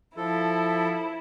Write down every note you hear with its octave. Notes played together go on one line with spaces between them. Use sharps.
F3 E4 A4